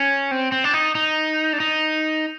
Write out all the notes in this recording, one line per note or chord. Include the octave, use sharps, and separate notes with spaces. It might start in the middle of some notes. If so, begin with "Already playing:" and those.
Already playing: C#4
C4
C4
D4
D#4
D#4
D4
D#4